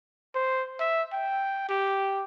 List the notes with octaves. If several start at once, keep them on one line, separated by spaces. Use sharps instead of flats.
C5
E5
G5
G4